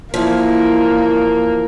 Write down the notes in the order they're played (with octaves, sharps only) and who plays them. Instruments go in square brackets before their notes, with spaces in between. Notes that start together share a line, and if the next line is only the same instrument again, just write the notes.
[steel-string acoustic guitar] E3 F3 [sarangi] A#3